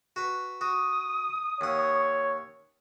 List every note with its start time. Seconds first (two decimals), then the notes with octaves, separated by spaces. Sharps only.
0.16 F#4 B4
0.61 F#4 D#6
1.61 D#2 C#5 F#5